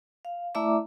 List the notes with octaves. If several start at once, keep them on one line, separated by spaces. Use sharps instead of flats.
F5
A3 E4 D5 E5 A#5 D6